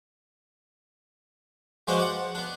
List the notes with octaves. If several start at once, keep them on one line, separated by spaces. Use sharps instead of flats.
F3 G#3 D4 F#4 B4 C5
D5 F#5
B3 D4